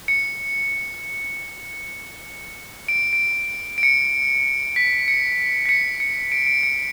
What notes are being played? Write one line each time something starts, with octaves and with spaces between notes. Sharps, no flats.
C#7
D7
D7
D7
C#7
B6
C#7
B6
C#7
C#7
D7
D7
C#7